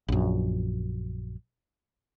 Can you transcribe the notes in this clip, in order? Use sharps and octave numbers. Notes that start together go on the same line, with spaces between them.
A#1 F#2